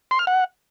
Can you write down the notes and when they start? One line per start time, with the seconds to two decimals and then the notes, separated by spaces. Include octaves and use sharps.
0.11 C6
0.19 F6
0.27 F#5